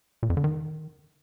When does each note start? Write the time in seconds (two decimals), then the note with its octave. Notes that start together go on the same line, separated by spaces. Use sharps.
0.23 A#2
0.30 F2
0.37 D3
0.44 D#3